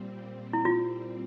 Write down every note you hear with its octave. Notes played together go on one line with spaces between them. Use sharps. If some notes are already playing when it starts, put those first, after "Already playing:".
Already playing: A#2 G3 C4
E4
F4